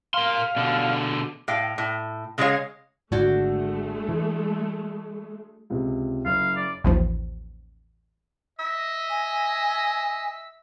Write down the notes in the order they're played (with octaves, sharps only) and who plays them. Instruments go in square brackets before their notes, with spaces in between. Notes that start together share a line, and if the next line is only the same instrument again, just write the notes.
[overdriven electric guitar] A#4 C6 [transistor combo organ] F5
[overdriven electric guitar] B2 D3
[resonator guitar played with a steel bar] A2 F5 G5
A2
C#3 G#3 E4 G#4 C#5 F5
[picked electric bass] G#1 D3 [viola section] G#3 A3 [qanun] D4 F#4 G5
[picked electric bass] E3
[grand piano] C#2 C3
[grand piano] F#1 [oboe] F5
[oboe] D5
[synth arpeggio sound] A1 D#2 F3
[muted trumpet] D#5 [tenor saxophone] E5
[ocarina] G#5